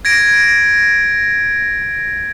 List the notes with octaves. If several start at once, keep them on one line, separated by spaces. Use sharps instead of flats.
G#6 A#6 D7